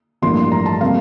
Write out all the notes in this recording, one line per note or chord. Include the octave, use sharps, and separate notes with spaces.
A1 G2 F3 A#3 C6
C6
A#5
A5
C3 G3 A#3 F5